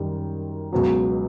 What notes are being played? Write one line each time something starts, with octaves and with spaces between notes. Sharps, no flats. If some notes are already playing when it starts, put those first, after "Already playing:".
Already playing: F#2 D#3 G3
C#2 B2 F#3